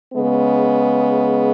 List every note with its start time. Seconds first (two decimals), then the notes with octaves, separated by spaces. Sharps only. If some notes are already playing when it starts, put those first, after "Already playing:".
0.13 C#3 G#3 B3